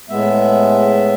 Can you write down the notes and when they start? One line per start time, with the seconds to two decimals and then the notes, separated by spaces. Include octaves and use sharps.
0.09 A2 G#3 B3 E5